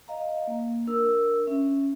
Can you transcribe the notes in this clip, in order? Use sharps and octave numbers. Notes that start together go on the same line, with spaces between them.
D#5 F5 A#5
A#3
D4 A#4 E6
C#4 E5